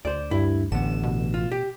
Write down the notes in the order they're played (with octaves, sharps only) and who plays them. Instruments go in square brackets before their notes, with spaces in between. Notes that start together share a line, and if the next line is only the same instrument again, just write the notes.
[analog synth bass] D2 [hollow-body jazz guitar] C5 D5
[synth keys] G2 [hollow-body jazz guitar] E4
[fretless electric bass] A1 [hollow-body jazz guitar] D3 B3 [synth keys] E7
[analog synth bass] B2
[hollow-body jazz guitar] F4
G4